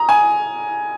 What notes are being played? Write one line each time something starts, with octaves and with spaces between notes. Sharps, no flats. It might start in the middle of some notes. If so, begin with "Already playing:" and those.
Already playing: A#5 D#6
G#5